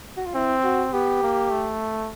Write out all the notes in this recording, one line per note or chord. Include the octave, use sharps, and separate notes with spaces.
F#4
F4
C4 E4
F#4
B3 G4
A#3
A3